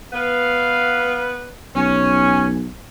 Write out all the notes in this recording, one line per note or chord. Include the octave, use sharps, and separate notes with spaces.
B3 B4 F5
B1 C#4 G#5